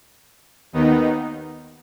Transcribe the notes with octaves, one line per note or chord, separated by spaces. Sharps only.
D#2 D#3 B3 D#4